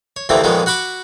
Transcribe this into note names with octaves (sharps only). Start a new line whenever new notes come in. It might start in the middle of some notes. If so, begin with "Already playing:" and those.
C#5
D2 C3 E3 A3 A#3 C4
F2 A#2 D#3 G#3 B3 C#4
F#4 F#5 B5 C#6 D6